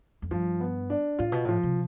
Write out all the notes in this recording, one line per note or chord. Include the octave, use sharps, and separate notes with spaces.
F2
G2 F3
B3
D4
A2 F4
B2
A2 F3
C3